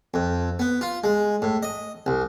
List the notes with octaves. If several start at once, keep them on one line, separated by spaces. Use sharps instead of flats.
F2
B3
F4
G#3
A2
D#5
C2